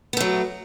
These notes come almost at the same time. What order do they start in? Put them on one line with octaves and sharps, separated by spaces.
B3 A3 F#3